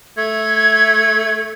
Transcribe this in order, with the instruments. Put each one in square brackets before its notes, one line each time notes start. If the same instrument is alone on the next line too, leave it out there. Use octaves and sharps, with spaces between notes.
[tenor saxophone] A3 [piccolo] G#6